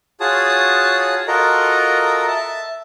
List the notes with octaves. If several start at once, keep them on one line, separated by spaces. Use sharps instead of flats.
F4 F#4 G#4 C#5 A5 D#6
F4 F#4 A4 A#4 D#5 A#5
E5 A5